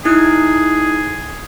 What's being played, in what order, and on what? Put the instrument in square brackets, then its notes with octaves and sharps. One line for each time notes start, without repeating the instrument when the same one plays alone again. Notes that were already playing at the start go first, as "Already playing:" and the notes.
[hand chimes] D#4 E4 F#6 [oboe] G#4